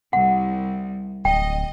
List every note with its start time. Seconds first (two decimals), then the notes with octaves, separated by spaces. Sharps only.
0.13 C2 F#5
1.25 D1 D#5 G5